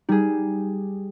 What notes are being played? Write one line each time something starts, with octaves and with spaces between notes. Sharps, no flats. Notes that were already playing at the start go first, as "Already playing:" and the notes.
G3 D#4 G#4